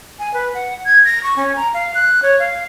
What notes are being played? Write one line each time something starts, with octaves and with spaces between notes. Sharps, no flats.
G#5
B4
F#5
G#6
A#6
C#6
C#4
A#5
F5
F#6
C#5
F5